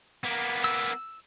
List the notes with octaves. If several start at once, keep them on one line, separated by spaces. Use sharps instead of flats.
A#3 B3
E6